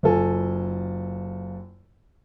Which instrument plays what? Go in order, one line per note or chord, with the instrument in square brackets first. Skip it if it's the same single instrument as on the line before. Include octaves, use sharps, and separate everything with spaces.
[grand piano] F#1 F4 A4 G#5